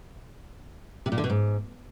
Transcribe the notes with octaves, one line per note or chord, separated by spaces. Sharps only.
C3
A#2
D3
B2
G#2